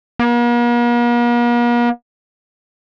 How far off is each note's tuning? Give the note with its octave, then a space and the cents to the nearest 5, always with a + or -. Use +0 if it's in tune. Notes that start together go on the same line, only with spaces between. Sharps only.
A#3 +45